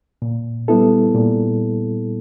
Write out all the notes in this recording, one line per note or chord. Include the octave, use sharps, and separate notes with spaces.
A#2
G3 B3 E4 A4
A#2